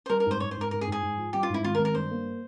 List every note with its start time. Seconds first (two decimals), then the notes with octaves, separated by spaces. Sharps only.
0.06 C5
0.10 G3 A#4
0.20 A#4
0.26 G#2
0.31 C5
0.40 G#2 C#5
0.51 C5
0.57 G#2 A#4
0.71 G#2 A#4
0.81 G#4
0.87 G#2
0.92 G#4
1.02 G#2
1.17 F3
1.33 G3 G4
1.43 F4
1.49 G#2
1.54 E4
1.64 G#1 F4
1.75 A#4
1.79 G#1
1.85 A#4
1.95 G2 C5
2.11 A#3